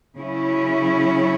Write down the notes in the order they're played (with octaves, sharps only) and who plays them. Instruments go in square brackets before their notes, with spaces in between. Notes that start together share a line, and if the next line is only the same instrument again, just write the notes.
[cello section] C#3 F#3 C#4 E4